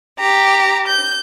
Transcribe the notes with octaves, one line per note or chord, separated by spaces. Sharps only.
G4 A#5
G6